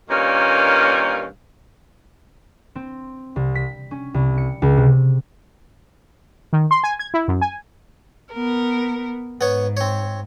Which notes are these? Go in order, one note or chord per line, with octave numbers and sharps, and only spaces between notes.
G2 A#2 D#3 A#3 C#4 F5
C4
C2
B6
C#4
C2
C#7
C#2
C3
D#3
C6
G#5
G#6
E4
F#2
G#5
B3 A#4
G#2 B3 C#5
C4 C#5